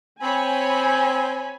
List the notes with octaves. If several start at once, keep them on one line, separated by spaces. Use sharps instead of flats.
C4 C#5 G#5 B5